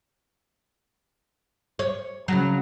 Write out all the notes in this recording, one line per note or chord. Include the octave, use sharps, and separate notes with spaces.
C#5
C#3 F#3